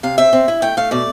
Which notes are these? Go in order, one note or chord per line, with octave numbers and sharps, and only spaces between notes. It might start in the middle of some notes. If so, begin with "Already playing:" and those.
C3 F5
C4 E5
C4
E4
A3 G5
A3 F5
B2 D5